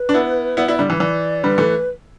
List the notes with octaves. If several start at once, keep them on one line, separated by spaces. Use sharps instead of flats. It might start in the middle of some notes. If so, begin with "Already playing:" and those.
Already playing: B4
D4
B3 E4
B3 E4 D5
B3 E4 D5
D3 G3 D5
E3 B4
E3 D5
D3 G3 B4
E3 A3